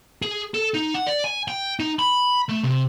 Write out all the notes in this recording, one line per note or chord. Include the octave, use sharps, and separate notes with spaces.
G#4
A4
D#4
F#5
D5
G#5
G5
D#4
B5
A3
C3